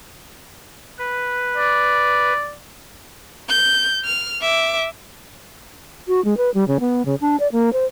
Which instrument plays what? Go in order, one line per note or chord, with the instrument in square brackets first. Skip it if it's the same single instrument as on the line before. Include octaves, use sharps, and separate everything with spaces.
[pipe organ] B4
[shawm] D5
[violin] G6
F6
E5 D6
[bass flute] F#4
G#3
B4
G3
C#3
B3
C#3
D4
D5
A#3
C5